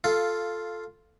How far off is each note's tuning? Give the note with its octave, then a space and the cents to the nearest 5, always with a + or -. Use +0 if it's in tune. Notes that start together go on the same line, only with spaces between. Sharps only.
F4 +0 A4 +0 F5 -10